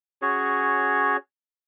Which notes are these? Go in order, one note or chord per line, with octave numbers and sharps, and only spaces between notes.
C#4 F#4 G#4 C#5